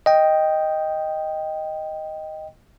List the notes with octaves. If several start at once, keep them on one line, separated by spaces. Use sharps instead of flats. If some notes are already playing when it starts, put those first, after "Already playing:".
D#5 G5